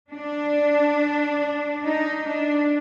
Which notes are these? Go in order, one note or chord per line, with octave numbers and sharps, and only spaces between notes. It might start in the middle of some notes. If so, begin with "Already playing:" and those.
D4
D#4
D4